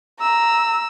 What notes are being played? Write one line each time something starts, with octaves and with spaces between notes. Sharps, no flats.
A#5 E6